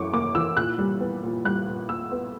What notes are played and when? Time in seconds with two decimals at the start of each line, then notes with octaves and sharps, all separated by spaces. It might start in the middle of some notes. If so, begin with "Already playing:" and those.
Already playing: F#2 E3 C#6 D6
0.13 A#3 D6
0.35 E3 E6
0.57 A#2 F#6
0.78 G3
1.01 B3
1.24 A#2
1.45 G3 F#6
1.68 A#2
1.89 A#2 E6
2.12 B3